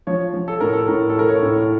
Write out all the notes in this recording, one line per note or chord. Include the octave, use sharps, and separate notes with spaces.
F3 C#5
F3
A4
A2 A#4
A4
A2 A#4
A4
A3 A#4
C#5
A2